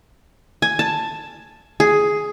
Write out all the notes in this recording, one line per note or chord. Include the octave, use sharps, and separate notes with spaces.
G#5
A5
G#4